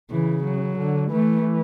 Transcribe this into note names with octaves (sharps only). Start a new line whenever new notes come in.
C#3 E3
F#3
D3
E3 A3